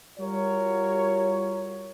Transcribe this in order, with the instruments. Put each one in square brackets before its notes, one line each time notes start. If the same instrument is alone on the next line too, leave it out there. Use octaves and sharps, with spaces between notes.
[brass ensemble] G3 F4 F#4 A#4 C#5